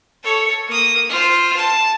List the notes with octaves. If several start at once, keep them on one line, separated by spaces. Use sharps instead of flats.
A4 C#5
A#3 D#6
F4 C5
A5